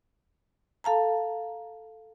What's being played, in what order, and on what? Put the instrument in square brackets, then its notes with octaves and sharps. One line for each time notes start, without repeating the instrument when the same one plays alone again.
[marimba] A4 F5 A5 A#5